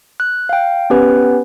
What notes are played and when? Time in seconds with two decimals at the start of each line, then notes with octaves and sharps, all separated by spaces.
0.20 F#6
0.49 F5 G5
0.90 B3 C#4 G4 B4